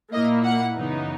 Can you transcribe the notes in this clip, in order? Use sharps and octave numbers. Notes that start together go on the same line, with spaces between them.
A#2 A#3 E4 D#5
F#5
F#2 C#3 E3 B3 D#4